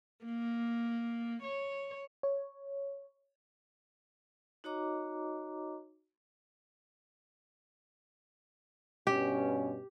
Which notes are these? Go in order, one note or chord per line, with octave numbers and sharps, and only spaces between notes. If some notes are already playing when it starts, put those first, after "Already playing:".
A#3
C#5
C#5
D#4 F#4 C#5 D#5 A#5 D6
G2 B2 C#4 G4